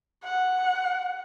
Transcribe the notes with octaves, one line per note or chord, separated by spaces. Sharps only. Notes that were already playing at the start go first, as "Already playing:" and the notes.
F#5